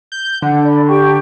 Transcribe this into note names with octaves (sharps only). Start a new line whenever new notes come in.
G6
D3 F#5
D5 B5
G4 G5 C#6